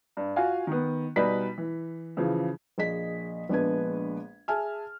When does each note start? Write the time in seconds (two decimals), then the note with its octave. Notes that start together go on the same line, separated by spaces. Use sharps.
0.17 G2
0.36 F4 F#4 F5 G#5
0.67 D#3 B3
1.16 B2 G3 D#4 B4 B6
1.58 E3
2.17 C#3 E3 F3
2.78 A#1 G#4 D#5 B6
3.49 A#1 G#3 B3 D4 B4 G#6
4.48 G#4 E5 G#5 A5 F6